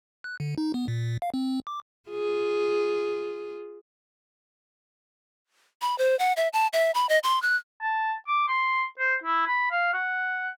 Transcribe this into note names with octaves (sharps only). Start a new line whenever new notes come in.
F#6
D3
D#4
B3
A#2
F5
C4
D6
F4 G#4
B5
C5
F#5
E5
A5
E5
B5
D#5
C6
F#6
A5
D6
C6
C5
E4
B5
F5
F#5